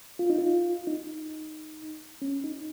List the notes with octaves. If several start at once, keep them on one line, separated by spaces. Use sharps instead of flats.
F4
D#4
F4
D#4
C#4
D#4